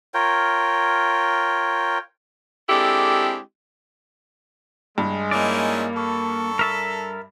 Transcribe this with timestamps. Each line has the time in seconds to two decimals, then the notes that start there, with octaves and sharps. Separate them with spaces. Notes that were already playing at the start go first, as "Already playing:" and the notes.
0.14 F4 A#4 C#5 G5
2.69 G#3 C4 D4 E4 G4 A4
4.98 G2 G#3
5.31 A#3 C#4 D#4 E4 D5
5.95 A4 C#6
6.59 A#4 E5 A5